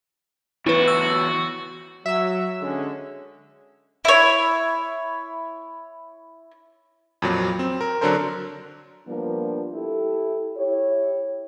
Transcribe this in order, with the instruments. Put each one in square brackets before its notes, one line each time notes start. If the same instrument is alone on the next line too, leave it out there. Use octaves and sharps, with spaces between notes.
[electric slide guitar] E3 B3 C#5 [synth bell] E4 B4 [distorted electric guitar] F#4
[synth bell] E6
[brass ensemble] F#3 [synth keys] E5 E6
[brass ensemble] D3 G#3 C#4
[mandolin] E4 C#5
[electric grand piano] F2 A#2 F#3
C4
A#4
D3 F#3 D4 A4 A#4 C5
[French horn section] F3 G3 A#3 B3 D4
E4 G4 A4
E4 G4 C#5